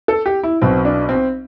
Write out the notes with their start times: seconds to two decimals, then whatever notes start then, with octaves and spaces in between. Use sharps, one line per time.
0.08 A4
0.26 G4
0.43 E4
0.62 B1 B2 C4
0.85 D4
1.09 C4